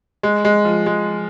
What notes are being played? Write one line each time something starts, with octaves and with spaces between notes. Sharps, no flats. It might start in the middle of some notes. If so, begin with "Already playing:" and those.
G#3
G#3
F3
G#3